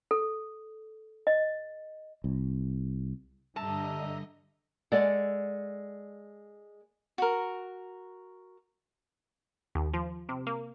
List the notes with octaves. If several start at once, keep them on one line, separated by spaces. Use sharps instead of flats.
A4
D#5
C2
G2 D3 G3 D#5 E5 A5 A#5
G#3 A4 D5 F#5
F#4 A#4
D#2
F3
C3
A#3